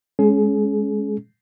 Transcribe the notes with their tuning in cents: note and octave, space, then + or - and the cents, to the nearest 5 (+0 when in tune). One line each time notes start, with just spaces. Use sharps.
G#3 +0 C#4 +0 G#4 +35